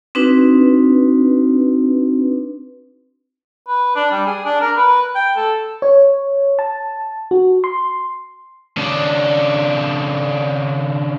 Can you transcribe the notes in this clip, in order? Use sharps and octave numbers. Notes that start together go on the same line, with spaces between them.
C4 D4 D#4 F#4 B4
B4
D4
G3
G#4
D4
A#4
B4
G5
A4
C#5
A5
F#4
C6
C#3 D4